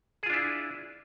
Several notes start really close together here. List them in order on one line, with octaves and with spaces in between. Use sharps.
G#4 F4 D4 E4